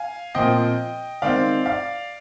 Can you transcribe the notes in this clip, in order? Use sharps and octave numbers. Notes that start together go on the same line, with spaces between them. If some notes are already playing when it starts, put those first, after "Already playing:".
Already playing: F5 G#5
A#2 F3 C4 D#5 G5
D#3 G#3 C4 D5 F5
D5 F5